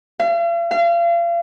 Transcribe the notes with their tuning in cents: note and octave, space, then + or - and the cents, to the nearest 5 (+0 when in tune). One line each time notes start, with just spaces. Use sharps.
F5 -45
F5 -35